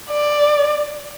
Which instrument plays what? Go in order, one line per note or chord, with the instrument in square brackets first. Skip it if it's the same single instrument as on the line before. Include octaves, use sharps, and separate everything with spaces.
[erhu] D5